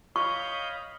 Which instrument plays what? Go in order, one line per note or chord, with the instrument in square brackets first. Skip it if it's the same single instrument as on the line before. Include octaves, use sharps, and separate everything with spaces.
[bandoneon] C#5 D#5 G6 [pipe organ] F5 B5 D#6 [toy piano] C#6